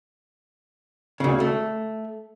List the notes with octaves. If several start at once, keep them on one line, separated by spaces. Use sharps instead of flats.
D2 C#3
A3